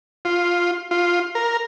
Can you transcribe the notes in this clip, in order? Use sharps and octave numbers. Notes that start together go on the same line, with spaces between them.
F4
F4
A#4